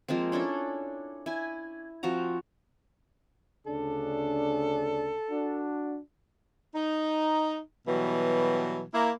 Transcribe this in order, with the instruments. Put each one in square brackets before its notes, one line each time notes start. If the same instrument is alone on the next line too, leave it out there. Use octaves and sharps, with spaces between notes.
[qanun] F3 G#3 A#3 C4
C#4 D4 E4 A4
E4 G#5
F3 C4 F#4 A#5
[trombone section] D2 C#3 D4 [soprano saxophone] A4
[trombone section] D4 F#4
[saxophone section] D#4
B2 E3 F#3 G3
A#3 E4